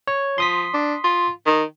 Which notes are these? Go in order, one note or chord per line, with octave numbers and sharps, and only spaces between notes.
C#5
F3 C6 D#6 B6
D4
F4
D#3